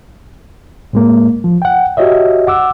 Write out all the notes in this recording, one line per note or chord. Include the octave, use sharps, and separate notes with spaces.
A2 G#3 A#3
F3
F#5 G5
F#4 G4 C#5 D#5 E5
F#5 D6 E6